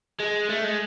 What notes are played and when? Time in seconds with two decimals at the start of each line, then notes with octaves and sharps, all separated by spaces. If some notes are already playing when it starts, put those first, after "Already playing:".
0.20 G#3
0.50 A3
0.64 G#3